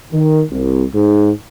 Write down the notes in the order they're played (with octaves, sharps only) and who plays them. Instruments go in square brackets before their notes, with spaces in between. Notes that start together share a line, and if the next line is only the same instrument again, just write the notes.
[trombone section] D#3
C2
G#2